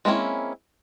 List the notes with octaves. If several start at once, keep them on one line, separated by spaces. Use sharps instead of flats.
G#3 A#3 C4 C#4 E4